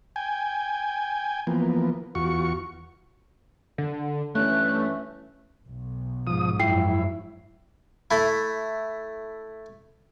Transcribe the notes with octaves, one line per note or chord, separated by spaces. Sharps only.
G5 G#5
E3 F3 A#3 B3
E2 F4 F#4 C#6
D3
G2 E3 A3 C#4 F#6
B1
G#2 F3 D#6
F#2 F3 F#3 E4 G5 C7
A3 E4